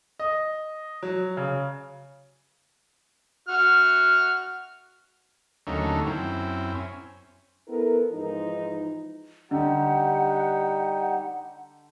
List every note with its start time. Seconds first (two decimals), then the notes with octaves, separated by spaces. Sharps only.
0.19 D#5
1.03 F#3
1.37 C#3
3.48 F#4 F6
5.67 D#2 D3 F#3 A3 C#4 D#4
6.06 F#2 C4 E4
6.74 C#4
7.67 B3 E4 A4 A#4
8.11 G#2 E3 F3 D#4
9.51 D3 G3 D#4 G4 F#5